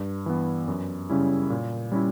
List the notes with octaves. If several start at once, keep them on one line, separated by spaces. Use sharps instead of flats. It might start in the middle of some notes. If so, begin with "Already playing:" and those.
Already playing: G2
E3 B3
F#2
C#3 G3 C#4 E4
A#2
G3 C#4 E4